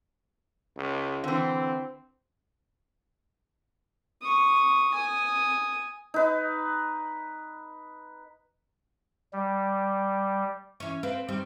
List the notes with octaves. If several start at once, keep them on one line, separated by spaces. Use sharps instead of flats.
C#2
D3 E3 C4
C#6 D#6
G#5 D#6
D#4 B4
G3
E3 C#4
C4 B4 F5
D#3 G3 C4